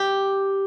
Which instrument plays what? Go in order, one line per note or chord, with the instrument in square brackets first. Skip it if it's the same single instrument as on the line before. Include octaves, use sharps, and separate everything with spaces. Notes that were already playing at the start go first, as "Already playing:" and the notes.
Already playing: [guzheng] G4